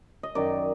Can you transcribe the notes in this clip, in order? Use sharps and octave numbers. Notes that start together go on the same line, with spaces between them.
D#5
F#2 D#3 F#3 D5